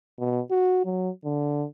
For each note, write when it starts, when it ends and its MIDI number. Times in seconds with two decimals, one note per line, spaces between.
0.19 0.41 47
0.51 0.81 66
0.85 1.09 54
1.25 1.65 50